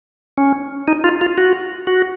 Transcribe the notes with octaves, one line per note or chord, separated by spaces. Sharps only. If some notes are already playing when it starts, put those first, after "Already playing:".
C#4
D#4
F4
F4
F#4
F#4